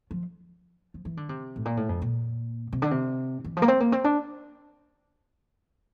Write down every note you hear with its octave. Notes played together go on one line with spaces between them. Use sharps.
F3
F3
E3
D3
C3
A2
A#2
A2
F2
A#2
C3
D3
C3
E3
F3
A#3
C4
A#3
C4
D4